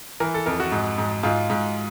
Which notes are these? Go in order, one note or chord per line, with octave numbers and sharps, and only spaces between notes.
E3 A#4
A4
F2 A#4
F#4
G#2
G#2
G#2 F4
G#2